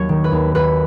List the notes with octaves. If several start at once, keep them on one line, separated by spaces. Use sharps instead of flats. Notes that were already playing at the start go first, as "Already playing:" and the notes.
Already playing: D#2 F#3 C#5
D#3
B4
D#2
D#2 B4